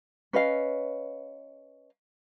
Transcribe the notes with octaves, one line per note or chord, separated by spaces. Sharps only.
C#4 B4 D#5 F5